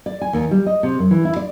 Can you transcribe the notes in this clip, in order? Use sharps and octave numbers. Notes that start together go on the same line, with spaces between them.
D5
G#5
D#2
G3
D#5
C3
F#2
E3
E4
D5